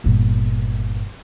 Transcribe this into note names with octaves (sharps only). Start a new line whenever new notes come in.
G1 A#2